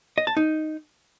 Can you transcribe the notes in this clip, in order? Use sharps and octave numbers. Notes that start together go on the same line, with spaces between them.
D#5
A5
D#4